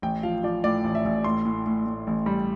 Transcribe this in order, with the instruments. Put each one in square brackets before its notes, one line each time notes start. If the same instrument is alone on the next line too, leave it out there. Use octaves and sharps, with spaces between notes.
[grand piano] A1 G5
F3 F5
F3 D5
A2 D5
A1
E5
A1
A2 C6
A2
A2
A2
A1
G3